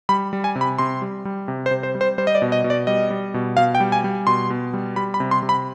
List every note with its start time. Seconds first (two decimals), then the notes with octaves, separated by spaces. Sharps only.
0.09 G3 B5
0.33 G3
0.44 G#5
0.56 C3
0.61 B5
0.78 C3 C6
1.02 G3
1.25 G3
1.48 C3
1.66 C5
1.71 C3
1.83 C5
1.95 G3
2.01 C5
2.18 G3 C5
2.27 D#5
2.35 D5
2.42 B2
2.52 D#5
2.64 B2
2.70 D5
2.87 G3 D#5
3.10 G3
3.34 B2
3.57 B2 F5
3.75 G5
3.80 G3
3.92 G#5
4.04 G3
4.27 B2 C6
4.50 B2
4.73 G3
4.96 G3 B5
5.14 B5
5.20 C3
5.31 C6
5.43 C3
5.49 B5